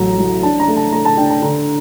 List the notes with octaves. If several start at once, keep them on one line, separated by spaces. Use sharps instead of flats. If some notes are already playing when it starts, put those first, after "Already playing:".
Already playing: A1 F#3 A3 A#5
F#3
D4 A5
A#5
A3
A5
A3 A#5
A5
D4 G5
A5
D3 A#5